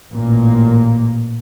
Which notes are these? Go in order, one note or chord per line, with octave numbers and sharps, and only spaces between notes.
A1 A#2 A#3